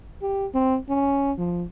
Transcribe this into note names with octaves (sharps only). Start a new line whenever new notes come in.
G4
C4
C#4
F3